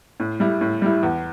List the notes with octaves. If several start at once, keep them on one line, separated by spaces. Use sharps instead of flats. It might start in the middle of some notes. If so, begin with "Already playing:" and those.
A2
G3 E4
A2
G3 E4
E2